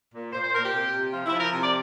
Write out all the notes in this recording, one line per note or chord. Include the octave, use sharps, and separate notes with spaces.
A#2
A#2 C5
C5
A#2 A#4
G4
C3
C3
F3 F4
E4
F3
A#4
C3
D5